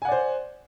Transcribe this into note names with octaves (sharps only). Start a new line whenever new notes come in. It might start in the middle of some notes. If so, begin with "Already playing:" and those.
C5 D5 F#5 G#5